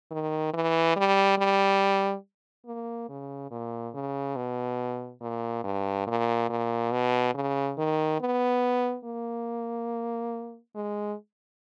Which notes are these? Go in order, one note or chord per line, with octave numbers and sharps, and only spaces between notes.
D#3
E3
G3
G3
A#3
C#3
A#2
C#3
B2
A#2
G2
A#2
A#2
B2
C#3
D#3
B3
A#3
G#3